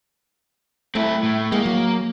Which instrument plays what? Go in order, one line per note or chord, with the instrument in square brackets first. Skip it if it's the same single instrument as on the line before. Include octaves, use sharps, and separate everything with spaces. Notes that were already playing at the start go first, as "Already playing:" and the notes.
[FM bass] A3 [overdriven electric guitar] C4 E4
[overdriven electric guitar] A2
[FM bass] G#3 [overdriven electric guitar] A#3
[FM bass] F#3